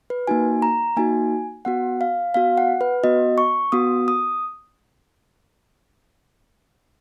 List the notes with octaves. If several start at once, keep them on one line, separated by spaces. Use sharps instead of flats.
B4
A#3 D#4 F#4 G#5
A#5
A#3 D#4 F#4 G#5
B3 F#4 F#5
F5
B3 F#4 F5
F#5
B4
B3 F#4 D#5
C#6
B3 F#4 D#6
D#6